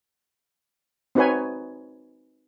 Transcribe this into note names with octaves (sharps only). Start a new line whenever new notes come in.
C4 D#4 F#4 B4 C#5 G#5